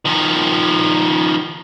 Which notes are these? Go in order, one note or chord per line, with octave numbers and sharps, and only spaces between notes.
D#3 F3